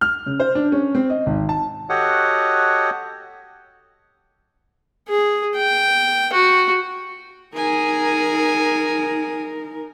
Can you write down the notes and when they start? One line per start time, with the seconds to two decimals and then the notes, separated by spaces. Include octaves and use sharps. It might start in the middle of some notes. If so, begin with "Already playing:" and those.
0.01 F6
0.26 C#3
0.40 C5
0.55 D4
0.72 C#4
0.95 C4
1.10 D#5
1.26 G#1
1.49 A5
1.89 F#4 G4 A4 C#5 D#5 F#5
5.08 G#4
5.56 G5
6.33 F#4
7.55 D#4 G#4 A#4 G#5